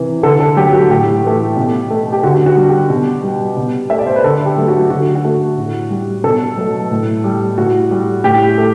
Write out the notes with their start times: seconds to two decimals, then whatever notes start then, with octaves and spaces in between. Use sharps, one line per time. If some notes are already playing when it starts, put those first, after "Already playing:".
Already playing: C3 E3
0.23 D3 A4
0.40 A4
0.56 F#3 A3 G4
0.73 F#4
0.90 A2 G4
1.23 E3 A3
1.57 B2
1.90 A3
2.13 G4
2.23 D3 F#4
2.46 F#4
2.57 G3
2.69 G4
2.90 B2
3.23 G3
3.57 B2
3.90 A3 E5
3.99 D5
4.07 C5
4.16 B4
4.24 D3 A4
4.46 G4
4.57 F#3 A3
4.68 F#4
4.90 D3 F#4
5.15 F#4
5.24 A3
5.57 A2
5.91 G3
6.24 B2 A4
6.57 F#3 A3
6.91 A2
7.24 G3
7.58 A2 F#4
7.91 G3
8.24 A2 G4
8.58 A3